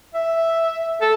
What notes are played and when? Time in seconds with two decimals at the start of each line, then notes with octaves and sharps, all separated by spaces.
0.15 E5
1.01 A4